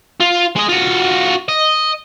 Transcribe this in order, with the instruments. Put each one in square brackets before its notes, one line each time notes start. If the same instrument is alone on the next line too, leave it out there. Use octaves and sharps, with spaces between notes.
[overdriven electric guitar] F4
G#3 D#5
F4 F#4
D#5